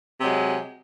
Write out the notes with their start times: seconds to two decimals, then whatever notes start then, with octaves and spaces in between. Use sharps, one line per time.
0.19 C3
0.22 F#3
0.25 G#3